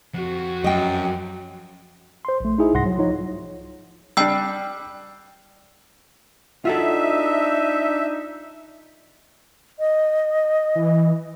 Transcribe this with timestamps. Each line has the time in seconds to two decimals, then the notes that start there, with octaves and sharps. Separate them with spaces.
0.14 F2 F#4
0.64 F#2 D#5 G5
2.25 C5 C6
2.40 A#1 A3
2.58 D#4 E4 G#4 E5
2.74 C2 G#2 F#5 C6 A#6
2.86 F#3
2.98 F3 D#4 F4 C#5
4.17 G3 D4 G5 E6
6.65 D4 D#4 F4 F#4 A4 E5
9.79 D#5
10.75 E3